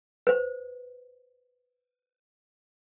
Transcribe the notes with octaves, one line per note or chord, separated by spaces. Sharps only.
B4 C5